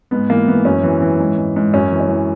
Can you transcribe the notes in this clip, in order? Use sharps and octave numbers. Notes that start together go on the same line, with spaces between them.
G#2 B3
E3 A#3
E3 B3
F#2 C#4
E3
E3
G#2
G#2
G#2
F#2 C#4
E3
C#4
E3